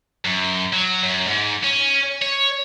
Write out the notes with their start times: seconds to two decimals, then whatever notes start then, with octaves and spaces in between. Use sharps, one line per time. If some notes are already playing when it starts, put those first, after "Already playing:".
0.25 F#2
0.73 F#3
1.02 F#2
1.27 G#2
1.63 C#4
2.22 C#5